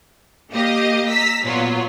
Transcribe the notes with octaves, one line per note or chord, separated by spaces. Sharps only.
A#3 G4 D#5 F5
A#5 E6 B6
A#2 F#3 B3 F4